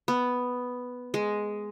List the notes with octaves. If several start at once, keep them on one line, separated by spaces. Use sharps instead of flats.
B3
G#3